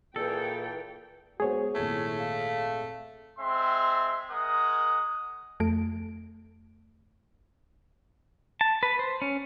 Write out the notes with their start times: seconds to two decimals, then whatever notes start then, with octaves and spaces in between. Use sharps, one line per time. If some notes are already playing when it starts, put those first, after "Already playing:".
0.16 A#2 E3 G#4 A4 G5
1.40 G#3 B3 F#4 G#4 C5 C#5
1.75 G#1 A#2 A3 E4 G#6
2.19 F5
3.38 G#3 C4 E5 C6
4.30 G#3 A#4 F#5 D#6
5.60 F2 A3 D7
8.61 A5
8.83 B4
8.99 C5
9.22 C#4